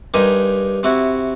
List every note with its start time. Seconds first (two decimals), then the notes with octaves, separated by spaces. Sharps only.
0.14 G2 D#4 G4 A#4 C5 G#5
0.83 C3 E4 F#4